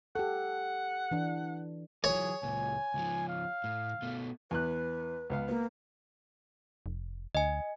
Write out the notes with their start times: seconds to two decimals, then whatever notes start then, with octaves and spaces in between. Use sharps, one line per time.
0.16 G4 A4 F#5
1.11 E3 D4
2.04 E3 F#3 G#4 C#5
2.43 C#2 A#2 G#5
2.94 C#2 F3
3.29 F5
3.64 A2
4.02 B2 A3
4.51 E2 B4 F#6
5.30 C#2 B3 F5
5.49 A#3 B3
6.86 F1
7.35 D2 D#5 G#5